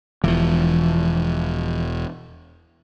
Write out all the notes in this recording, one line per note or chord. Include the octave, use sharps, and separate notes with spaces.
E1 E3 F3